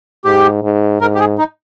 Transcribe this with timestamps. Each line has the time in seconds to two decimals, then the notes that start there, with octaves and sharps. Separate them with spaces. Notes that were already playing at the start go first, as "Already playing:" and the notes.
0.25 G#2 G4
0.63 G#2
1.01 G#2 A#4
1.15 G4
1.20 G#4
1.38 D#4